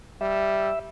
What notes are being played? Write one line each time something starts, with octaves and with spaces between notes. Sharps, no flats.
G3 E5